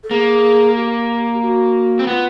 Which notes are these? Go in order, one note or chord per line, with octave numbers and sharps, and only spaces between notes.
A4
A#3 G#4
G4
F#4
C4
B3 F4